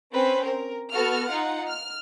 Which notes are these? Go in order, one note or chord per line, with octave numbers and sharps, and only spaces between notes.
C4 C#4 B4 C5
A#4
B3 F#4 A4 F6
D#4 F4 F#5
F6